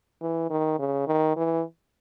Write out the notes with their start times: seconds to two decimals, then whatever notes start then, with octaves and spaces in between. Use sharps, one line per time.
0.22 E3
0.50 D#3
0.79 C#3
1.07 D#3
1.36 E3